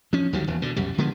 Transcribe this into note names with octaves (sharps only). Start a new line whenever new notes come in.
F3 C#4
D2 D#3 F#3 G3
D#1 E2
B2 D3
C2 F#2 G3
D3 F3 G#3 B3